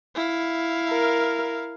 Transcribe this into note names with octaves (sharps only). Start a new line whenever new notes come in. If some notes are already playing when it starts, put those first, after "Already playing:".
E4 F5
A#4